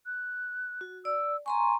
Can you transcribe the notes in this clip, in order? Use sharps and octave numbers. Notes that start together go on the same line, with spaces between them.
F#6
F#4
D5 E6
G#5 A#5 C6 C#6